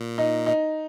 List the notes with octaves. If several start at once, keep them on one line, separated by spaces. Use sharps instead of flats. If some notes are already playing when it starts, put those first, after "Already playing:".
Already playing: A#2
D#4
D#4